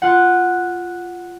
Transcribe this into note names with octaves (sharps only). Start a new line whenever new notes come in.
F4 F#5